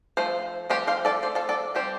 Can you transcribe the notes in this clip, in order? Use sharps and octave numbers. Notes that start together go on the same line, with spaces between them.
F3 A3 C5
F3 A3 C4 G4 C5
C5 F5
A4 D5
F3 A3 C5
F4 A4
A4 D5
G3 C4 G4 C5